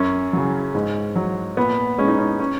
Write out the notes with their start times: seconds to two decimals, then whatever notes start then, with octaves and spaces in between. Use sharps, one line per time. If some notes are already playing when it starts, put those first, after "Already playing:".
Already playing: F#2 C#4
0.33 C#3 F#3
0.75 G#2
1.16 F#3
1.57 A#2 B3
1.98 G#3 C#4
2.08 D#4
2.18 C#4
2.39 C#4